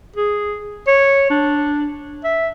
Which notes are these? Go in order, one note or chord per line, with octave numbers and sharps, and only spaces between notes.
G#4
C#5
D4
E5